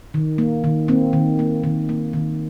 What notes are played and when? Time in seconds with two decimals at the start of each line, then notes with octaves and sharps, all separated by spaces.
0.14 D#3
0.38 A#3
0.64 D#3
0.88 A#3 C4
1.13 D#3
1.39 A#3
1.64 D#3
1.89 A#3
2.13 D#3